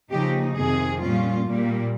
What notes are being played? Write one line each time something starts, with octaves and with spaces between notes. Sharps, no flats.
C#3 F3 A#3 D#4 G4
F2 C3 D#3 G#4
A#2 G3 C#4 F4
A#2 G3 A#3